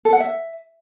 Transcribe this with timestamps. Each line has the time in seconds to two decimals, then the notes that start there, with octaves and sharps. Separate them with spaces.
0.05 A4
0.13 F#5
0.20 E5